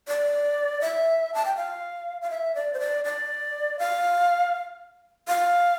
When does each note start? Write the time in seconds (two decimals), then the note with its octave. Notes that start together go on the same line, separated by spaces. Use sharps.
0.08 D5
0.81 E5
1.34 A5
1.45 G5
1.56 F5
2.22 F5
2.30 E5
2.55 D5
2.74 C5
2.80 D5
3.05 D5
3.79 F5
5.28 F5